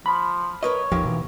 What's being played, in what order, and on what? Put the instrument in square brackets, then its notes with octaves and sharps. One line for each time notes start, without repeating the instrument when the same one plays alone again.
[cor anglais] F3 [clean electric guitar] B5
[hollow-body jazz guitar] A#4 B4 D#5 [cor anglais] C#5
[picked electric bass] G1 D#2 F3 [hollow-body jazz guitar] A#2 D#3 G4
[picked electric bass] B2 E3